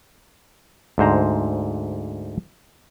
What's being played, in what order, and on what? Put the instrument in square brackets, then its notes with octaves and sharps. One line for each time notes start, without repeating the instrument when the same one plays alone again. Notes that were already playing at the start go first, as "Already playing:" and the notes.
[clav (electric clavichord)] D2 G#2 C5 A#5